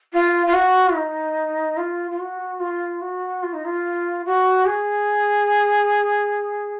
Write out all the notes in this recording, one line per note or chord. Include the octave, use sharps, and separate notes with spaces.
F4
F4
F#4
D#4
F4
F4
F#4
F4
F#4
F4
D#4
F4
F#4
G#4